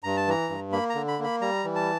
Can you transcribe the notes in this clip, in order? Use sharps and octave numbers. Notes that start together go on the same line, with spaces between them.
G2 A#5
A5
E3 A#5
G2
A#3 B5
A#5
D3
B5
A#3 B5
G3 A#5
E3
A5